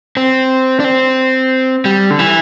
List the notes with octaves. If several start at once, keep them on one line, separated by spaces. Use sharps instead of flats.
C4
D4
C4
G3
D3
E3